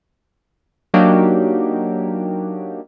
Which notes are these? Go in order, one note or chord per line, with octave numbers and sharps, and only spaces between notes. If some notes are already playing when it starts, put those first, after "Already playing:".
F#3 A#3 D4 D#4 F#4 G4